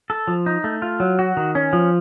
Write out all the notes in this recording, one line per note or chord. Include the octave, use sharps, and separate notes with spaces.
A4
F3
D#4
A3
F4
F#3
F#4
D#3
C#4
F3